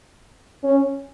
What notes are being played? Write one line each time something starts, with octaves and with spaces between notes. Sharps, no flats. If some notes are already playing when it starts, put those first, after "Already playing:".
C#4